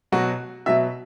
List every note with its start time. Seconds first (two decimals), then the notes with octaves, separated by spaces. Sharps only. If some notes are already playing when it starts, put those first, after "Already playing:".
0.12 B2 F#3 F#4
0.66 B2 F#3 E5